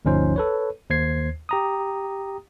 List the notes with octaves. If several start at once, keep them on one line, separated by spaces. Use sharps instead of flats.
G1 D2 F3 C#4 D#4 C5
A4 B4 C#5
D#2 C5 G#6 C7
G4 A#5 D#6